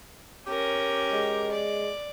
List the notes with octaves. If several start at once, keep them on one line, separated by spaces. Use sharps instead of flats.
C#4 G4 A#4
G#3
D5